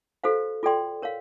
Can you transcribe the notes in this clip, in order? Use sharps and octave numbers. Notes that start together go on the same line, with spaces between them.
F#4 A4 C5 F5
F4 A4 D5 G5 C6
A#4 C#5 F5